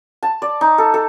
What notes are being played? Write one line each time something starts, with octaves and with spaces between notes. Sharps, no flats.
A5
D5
D#4
A4
A4